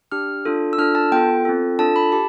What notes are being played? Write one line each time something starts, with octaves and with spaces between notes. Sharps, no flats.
D4 G4 F6
D4 F4 A4
E6
D4 F4 A4 F6
A5
B3 F4 A4 G5
C4 F4 A4
D4 F4 A4 A5
B5
G4 A5